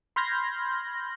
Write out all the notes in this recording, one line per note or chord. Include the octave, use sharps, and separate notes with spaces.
B5 C6 F6 G6 G#6 A#6